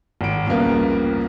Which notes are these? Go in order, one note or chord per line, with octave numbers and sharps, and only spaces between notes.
G#1 D7
C2 F2 C#3 A#3 B3